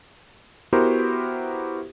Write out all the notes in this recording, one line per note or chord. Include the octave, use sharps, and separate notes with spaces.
B3 E4 F#4 G4 A#4 C5